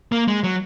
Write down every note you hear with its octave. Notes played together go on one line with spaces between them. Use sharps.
A#3
G#3
F#3